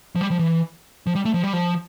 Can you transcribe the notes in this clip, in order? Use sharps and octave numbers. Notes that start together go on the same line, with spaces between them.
F3
G3
F3
E3
F3
G3
A3
F3
G3
F3